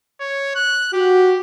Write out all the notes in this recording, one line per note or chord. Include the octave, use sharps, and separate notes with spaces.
C#5
F#6
F#4 G4